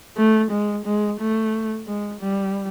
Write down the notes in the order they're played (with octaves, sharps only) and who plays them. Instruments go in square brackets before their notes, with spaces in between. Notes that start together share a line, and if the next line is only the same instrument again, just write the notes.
[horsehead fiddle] A3
G#3
G#3
A3
G#3
G3